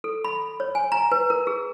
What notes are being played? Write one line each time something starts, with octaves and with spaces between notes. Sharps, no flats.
A4
B5
C#5
G#5
A#5
B4
A#4
G#4